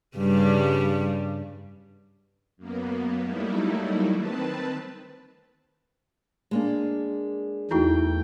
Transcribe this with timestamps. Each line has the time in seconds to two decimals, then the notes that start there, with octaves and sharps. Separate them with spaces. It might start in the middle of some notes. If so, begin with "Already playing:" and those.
0.18 G2 C#3 G3
2.57 F#2 A#3 B3
3.23 F#3 G3 A3 A#3 D#4 E4
4.15 D#3 C4 B4 A5
6.51 G#3 A#3 D4
7.71 E2 A3 D#4 E4 F#4 G5